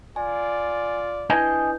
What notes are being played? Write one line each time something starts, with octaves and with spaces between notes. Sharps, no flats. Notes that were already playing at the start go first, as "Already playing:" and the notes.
F4 D5 G#5
D4 E4 B4 D#5 G#5 G6